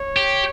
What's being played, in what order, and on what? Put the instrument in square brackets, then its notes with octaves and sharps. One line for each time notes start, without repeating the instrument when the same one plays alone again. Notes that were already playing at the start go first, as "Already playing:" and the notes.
Already playing: [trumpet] C#5
[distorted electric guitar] G4